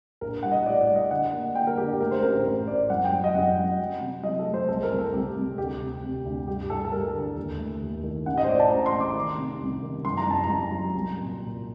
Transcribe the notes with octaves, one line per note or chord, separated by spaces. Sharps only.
A#1 A#4
G3 F#5
D#5
A2 D5
D5
G3
D#5
D3 F#5
A#3
A#3 G5
A#4
D3 G4
A3 A#4
C5
A1 A#4
A1 C5
A2 D5
F#2 F#5
G5
F#3
D#5
F#2 F#5
F#3
F#3
C3
F#3 D#5
A4
A3
C5
C2 A4
A#4
C2
A4
C2 G4
C2
D2 G4
C3
C3
D2
G2 G4
G2 A4
A4
G3 A#4
D3
D#2
A3
D#2
D#3
A1 F#5
D#5
C5
A2 D5
A5
A1 A#5
C6
A1
D6
D#3
C3
C2
D#3
F#2 C6
A#5
F#2 A5
A#5
F#2
F#3
C2
A#2
A#2